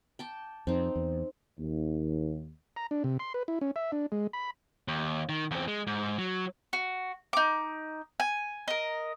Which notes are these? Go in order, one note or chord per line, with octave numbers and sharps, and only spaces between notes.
G5 A5 D6
F2 C4 D#4
E2
D#2
A#5
D4
C3
C6
B4
E4
C#4
E5
D4
G#3
B5
D#2
D#3
E2 C4
G#3
G#2
F#3
F#4
D#4 D6
G#5
A#4 D#5